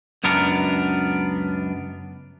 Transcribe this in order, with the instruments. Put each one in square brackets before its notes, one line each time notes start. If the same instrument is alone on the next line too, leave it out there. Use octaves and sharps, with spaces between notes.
[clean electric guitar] C#2 F#2 B3 D4 A#4